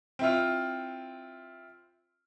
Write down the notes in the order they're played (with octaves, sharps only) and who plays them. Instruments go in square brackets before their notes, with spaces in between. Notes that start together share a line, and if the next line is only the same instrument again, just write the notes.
[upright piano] C4 E4 F4